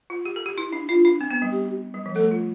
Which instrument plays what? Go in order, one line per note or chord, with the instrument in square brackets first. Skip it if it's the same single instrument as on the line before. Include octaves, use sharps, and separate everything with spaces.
[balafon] F4
G4
A4
G4
E4
D4
[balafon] D4 [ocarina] F4
[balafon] D4
C4
B3
G3
[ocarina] G4
[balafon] G3
F3
[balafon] A3 [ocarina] A4
[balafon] F4